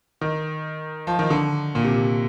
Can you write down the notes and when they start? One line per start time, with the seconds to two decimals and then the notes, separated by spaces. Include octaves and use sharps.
0.21 D#3
1.07 F3
1.19 D#3
1.30 D3
1.75 A#2
1.84 C3